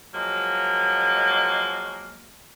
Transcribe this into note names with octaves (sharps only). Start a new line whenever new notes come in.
F3 F#3 G#3 A#3